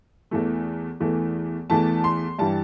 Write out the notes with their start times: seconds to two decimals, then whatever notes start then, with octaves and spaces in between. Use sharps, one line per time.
0.31 E2 E3 A3
1.00 E2 E3 A3
1.70 E2 E3 A3 A5
2.04 C6
2.39 G2 E3 G3 A5